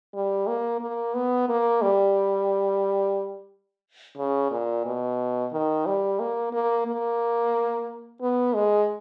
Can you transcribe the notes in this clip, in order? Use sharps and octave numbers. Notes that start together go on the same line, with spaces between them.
G3
A#3
A#3
B3
A#3
G3
C#3
A#2
B2
D#3
G3
A#3
A#3
A#3
B3
G#3